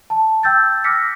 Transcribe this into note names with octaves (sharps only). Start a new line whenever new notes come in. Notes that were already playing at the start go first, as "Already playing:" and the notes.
A5
G5 E6 G6 A6
D6 E6 F6 A#6 B6 C#7